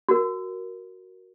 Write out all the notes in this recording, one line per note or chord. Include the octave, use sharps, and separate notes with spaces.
F#4 A#4